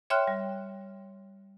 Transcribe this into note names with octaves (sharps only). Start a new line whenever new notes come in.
C#5 E5 G5 C6 F6 F#6
G3